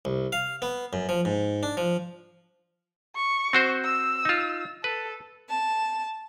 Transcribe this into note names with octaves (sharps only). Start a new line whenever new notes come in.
C2
F5
B3
F#2
F3
G#2
D4
F3
C#6
C4 F#4 C5
E6
D#4 F4
A4 B4
A5